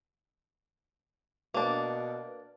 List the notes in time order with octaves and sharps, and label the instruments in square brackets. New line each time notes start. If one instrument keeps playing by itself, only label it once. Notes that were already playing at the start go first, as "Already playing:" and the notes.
[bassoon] B2 [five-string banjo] A#3 D4